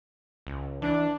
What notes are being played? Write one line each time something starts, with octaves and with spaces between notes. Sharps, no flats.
C#2
E3 D4